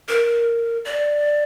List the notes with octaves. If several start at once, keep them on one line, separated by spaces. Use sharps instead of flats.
A#4
D5